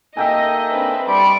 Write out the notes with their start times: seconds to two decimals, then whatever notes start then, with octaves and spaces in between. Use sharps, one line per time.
0.17 A#3 D#4 A4 D#5 E5 G5 G#5
0.72 C4 D4 B4
1.08 G3 D5 C6 C#6 D7